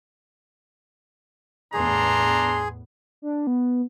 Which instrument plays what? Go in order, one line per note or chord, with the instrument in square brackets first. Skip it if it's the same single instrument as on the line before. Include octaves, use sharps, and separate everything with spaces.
[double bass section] E2 A2 B3 [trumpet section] D4 A#5 C6 [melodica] G#4
[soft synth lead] D4
B3